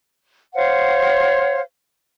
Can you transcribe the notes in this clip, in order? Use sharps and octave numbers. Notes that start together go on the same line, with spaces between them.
C5 C#5 F5 F#5